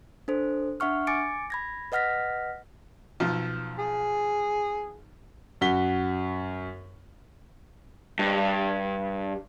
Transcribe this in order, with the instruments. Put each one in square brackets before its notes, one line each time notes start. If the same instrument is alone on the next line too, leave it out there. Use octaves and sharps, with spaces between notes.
[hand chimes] D4 A4 C5
D4 E5 F#5 C#6 F6
G#5 D6 A6 C#7 D7
B5 G#6 A#6
B4 D#5 F#5 F6 A#6 B6
[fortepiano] B1 F3
[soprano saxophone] G#4
[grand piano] F#2 F#4 B6 G7
[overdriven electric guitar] G2